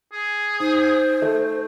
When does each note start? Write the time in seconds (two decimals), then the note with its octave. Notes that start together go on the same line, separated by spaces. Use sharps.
0.13 G#4
0.60 D#4 C5
1.22 A3